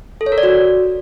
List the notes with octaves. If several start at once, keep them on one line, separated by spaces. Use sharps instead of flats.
A4
C#5
A#4
D5
F#4